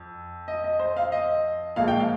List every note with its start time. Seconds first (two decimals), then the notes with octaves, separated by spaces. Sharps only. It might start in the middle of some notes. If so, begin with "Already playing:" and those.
Already playing: F2
0.48 D#5
0.64 D#5
0.79 C5
0.97 F5
1.12 D#5
1.76 A#1 A#2 F3 G#3 F5
1.88 G5
2.00 F5